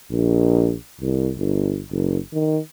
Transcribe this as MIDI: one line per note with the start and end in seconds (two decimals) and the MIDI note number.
0.11 0.74 34
1.01 1.30 36
1.37 1.82 31
1.91 2.18 30
2.33 2.59 51